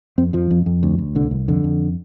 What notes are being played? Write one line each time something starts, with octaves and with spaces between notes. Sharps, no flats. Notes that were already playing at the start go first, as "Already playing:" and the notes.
F2 C4
F2 F3
F2
F2
D2
D2
C2 D3
C2
F2 D3
F2